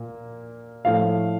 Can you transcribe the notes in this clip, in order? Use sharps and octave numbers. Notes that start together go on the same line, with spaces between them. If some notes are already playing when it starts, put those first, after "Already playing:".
Already playing: A#2 A#3
A2 F3 A3 F5